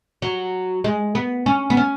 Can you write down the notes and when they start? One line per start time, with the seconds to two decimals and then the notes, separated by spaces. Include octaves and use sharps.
0.22 F#3
0.84 G#3
1.15 B3
1.46 C#4
1.70 B3
1.77 C#4